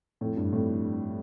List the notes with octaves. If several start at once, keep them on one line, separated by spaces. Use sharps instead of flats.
F2 A2
G2
F2 A2